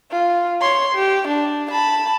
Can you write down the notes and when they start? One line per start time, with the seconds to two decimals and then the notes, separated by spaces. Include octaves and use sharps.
0.11 F4
0.61 C#5 C6
0.95 G4
1.28 D4
1.71 A5 B5